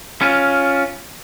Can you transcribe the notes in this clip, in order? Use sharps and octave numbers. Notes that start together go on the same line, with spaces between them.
C#4 F4